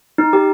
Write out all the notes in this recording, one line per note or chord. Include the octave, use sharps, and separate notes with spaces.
D#4
G4